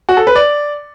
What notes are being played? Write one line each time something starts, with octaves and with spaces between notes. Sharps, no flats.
F#4
A4
B4
D5